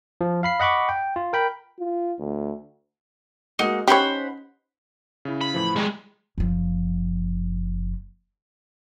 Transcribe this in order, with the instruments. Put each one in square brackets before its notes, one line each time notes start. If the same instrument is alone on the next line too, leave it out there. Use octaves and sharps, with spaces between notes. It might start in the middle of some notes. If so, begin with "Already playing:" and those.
[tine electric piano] F3
F5 B5 C7
D#5 F#5 B5 C#6 D6
G5
F4
A#4 G5 B5
[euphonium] F4
D2
[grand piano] G#3 A#3 F#4 [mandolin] D#4
[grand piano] C#4 D#4 [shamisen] G4 C#5 [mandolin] C5 F#5 B5
[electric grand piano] C#3 E4
[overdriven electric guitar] B5
[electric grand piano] A2 E3 F3
[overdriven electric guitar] G3 G#3 [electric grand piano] A#5 C#6
[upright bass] F#1 F3